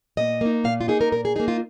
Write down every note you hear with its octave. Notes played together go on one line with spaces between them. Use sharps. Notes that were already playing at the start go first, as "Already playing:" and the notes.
A#2 D#5
A#3 D#4
A#2 F5
F4
A#3 D#4 G#4
A#4
A#2 A#4
G#4
A#3 D#4 G#4
F4